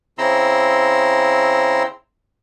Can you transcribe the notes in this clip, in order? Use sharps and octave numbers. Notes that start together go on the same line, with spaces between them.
C#3 C4 E4 A#5 C6 E6